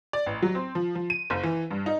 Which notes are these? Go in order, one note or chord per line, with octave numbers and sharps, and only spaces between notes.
D5
A1
F#3
C4
F3
F3
D#7
F#1
E3
G2
D#4